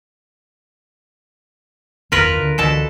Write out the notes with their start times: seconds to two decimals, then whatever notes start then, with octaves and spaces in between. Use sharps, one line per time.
2.12 F#1 E2 D#3 F4 A#4 B4
2.36 D2 D3
2.58 C#2 B2 D3 E3 A4 A5